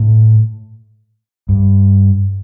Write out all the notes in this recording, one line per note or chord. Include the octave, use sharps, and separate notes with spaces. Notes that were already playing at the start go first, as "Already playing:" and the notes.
Already playing: A2
G2